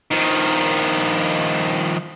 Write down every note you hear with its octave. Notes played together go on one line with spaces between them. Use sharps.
D#3 F3